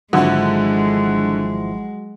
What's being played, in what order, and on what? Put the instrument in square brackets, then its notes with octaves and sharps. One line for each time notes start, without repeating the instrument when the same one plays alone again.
[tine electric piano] G#1 F3 E4 [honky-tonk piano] D3 F#4 [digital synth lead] F#3 [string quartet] G#3